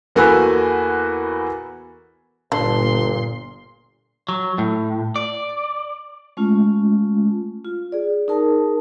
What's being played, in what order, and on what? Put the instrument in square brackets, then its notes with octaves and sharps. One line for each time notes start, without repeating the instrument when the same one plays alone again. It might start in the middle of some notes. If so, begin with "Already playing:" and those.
[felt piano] E2 A#3 F#4 A4 B4 G#5
[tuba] G1 [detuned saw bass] A#2 [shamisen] D4 A4 [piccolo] C6
[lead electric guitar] F#3
A2
D5
[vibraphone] G#3 A3 C#4 F4
F4
G#4 D5
D#4 G#4 A#4 A5